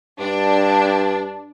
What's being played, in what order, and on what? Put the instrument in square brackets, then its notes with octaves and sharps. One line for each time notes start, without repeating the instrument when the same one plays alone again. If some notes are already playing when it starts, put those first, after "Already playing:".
[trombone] G2 [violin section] D4